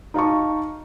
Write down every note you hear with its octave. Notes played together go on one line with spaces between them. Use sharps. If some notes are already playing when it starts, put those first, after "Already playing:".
D#4 F5 A5 C#6